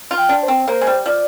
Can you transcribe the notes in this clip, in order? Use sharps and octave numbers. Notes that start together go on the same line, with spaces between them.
F4
G5
D4
C5
C4
A#3 C5
G#3
G3
F3 D5